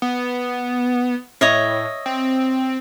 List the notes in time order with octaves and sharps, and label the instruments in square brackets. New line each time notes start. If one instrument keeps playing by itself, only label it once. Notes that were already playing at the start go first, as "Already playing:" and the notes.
[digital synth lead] B3
[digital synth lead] A2 [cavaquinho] C#5 D#5 E5
[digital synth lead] C4